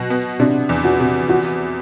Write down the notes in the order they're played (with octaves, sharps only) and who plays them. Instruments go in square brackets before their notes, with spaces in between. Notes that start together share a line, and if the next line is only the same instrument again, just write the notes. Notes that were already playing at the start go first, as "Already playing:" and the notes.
Already playing: [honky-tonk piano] B2 [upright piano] F#3
[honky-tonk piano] B3
[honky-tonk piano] C3 [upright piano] D4
[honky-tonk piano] E2
[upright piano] F#4
[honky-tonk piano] C3
[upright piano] F#4